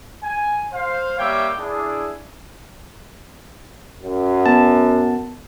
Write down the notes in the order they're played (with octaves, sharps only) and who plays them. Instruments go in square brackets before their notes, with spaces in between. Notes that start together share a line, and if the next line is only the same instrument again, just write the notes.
[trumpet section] G#5
C5 F5
G3 A#3 C#5 E5 G5 D6
D4 E4 G#4
[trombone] F#2
[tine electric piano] B3 A5